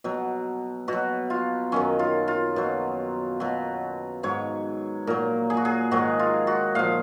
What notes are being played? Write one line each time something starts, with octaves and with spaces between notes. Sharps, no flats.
B2 F#3
B2 F#3 F#4
F4
F#2 D#3 F#3 C#4
F4
F4
B2 F#3
B2 F#3
G#2 F#3 C#5
A#2 F#3 A#4
G#4
F#4
G#4
G#2 D#3 F#3 F#4
F4
F#4
A#2 F3 F5